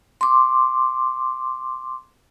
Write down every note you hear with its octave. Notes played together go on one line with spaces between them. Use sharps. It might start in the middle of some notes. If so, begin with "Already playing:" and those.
C6 D6